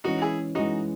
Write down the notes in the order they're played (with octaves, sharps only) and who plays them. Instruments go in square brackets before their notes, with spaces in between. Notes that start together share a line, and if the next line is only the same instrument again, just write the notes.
[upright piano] E3 G#3 C#4 [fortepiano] D#4 F#4
[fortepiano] E4 G#4
[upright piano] E3 G#3 C#4 [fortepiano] D#4 F#4